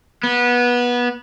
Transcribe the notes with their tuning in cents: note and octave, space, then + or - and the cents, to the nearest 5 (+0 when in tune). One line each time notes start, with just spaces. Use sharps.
B3 -20